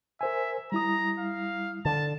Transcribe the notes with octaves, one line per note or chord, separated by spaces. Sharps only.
A#4 C5 E5 G#5
G3 E4 A#5 D#6
F5
D3 A5